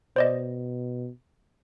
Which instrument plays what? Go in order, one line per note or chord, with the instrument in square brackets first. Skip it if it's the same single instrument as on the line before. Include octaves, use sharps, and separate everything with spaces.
[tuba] B2 [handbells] C5 D5 D#5